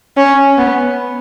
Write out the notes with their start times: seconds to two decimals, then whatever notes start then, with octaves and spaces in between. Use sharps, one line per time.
0.17 C#4
0.58 B3